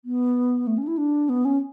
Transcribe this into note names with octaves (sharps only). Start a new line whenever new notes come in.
B3
A3
C#4
D4
E4
D4
B3
C#4